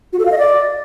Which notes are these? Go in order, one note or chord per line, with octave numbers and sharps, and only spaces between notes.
F#4
A4
F5
D#5
D5